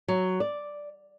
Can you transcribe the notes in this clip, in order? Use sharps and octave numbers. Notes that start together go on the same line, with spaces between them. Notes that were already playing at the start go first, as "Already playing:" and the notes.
F#3
D5